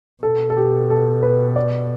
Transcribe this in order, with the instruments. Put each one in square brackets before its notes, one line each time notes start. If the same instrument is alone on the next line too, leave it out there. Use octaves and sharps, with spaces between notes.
[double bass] B2 [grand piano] A4
[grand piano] A4
G4
A4
B4
D5